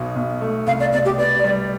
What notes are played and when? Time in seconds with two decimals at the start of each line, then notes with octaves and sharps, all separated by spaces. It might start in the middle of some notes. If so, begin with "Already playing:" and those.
Already playing: B1 B2
0.16 B1
0.41 A3
0.67 C2 F5
0.80 D5
0.93 B2 D5
1.05 G4
1.18 B3 D5
1.44 G3